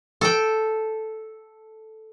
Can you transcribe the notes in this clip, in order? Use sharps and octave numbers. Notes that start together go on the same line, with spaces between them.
A4 G5